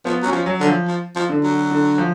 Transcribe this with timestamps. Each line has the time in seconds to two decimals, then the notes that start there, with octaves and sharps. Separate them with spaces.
0.05 F3 B3
0.23 F#3 C#4
0.33 F3
0.46 F#3
0.60 D3
0.67 F3
0.88 F3
1.16 F3
1.29 D3
1.43 F#3
1.71 D3
1.98 F3